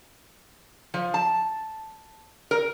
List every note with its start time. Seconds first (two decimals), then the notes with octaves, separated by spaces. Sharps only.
0.94 F3
1.14 A5
2.51 A#4